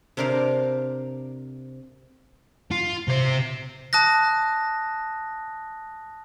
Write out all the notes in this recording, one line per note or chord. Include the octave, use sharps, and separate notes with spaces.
C3 D4 A#4 C5 D5 F5
F4
C3 C5
A5 D#6 F#6 A#6